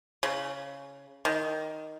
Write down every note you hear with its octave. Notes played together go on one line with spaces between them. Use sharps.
C#3
D#3